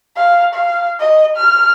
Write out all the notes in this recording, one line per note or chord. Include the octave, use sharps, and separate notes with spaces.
F5
F5
D#5
F6